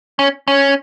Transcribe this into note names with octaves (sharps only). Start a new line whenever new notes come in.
C#4
C#4